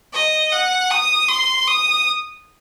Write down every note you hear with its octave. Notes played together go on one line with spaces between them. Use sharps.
D#5
F#5
D#6
C6
D#6